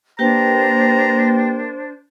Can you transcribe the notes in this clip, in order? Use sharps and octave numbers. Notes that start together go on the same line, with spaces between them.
A#3 D4 G4 B4 C5 G5 A#5